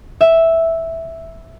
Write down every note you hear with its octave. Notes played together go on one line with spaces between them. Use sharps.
E5